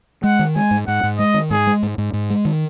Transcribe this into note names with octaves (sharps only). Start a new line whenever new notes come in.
G#3 F#5
D#3
G#3 G#5
G#2
G#2 F#5
G#2
G#3 D#5
D#3
G#2 G#4
G#3
G#2
G#2
G#2
G#3
D#3